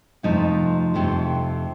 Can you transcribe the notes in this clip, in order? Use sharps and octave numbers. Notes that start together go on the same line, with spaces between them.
F2 C3 F3 A3 D#4
F2 C3 F3 A3